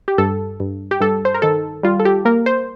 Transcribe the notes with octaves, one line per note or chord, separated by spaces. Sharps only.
G4
G2 A4
G2
G4
G2 A4
C5
A#4
D#3 A4
G3 F4
A4
G4
A#3 A#4
C5